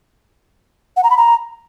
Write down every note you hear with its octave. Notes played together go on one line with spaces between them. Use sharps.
F#5
A#5
B5
A#5